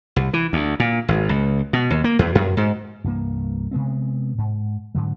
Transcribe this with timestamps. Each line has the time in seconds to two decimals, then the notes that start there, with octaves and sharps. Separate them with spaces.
0.16 C2
0.33 E3
0.53 D2
0.80 A#2
1.08 G#1
1.29 C#2
1.73 B2
1.90 D#2
2.04 A#3
2.19 E2
2.35 F#2
2.57 G#2
3.04 C2 G2 E3 A#3
3.71 C3 G#3 B3 C4
4.38 G#2
4.95 G#2 D3 F#3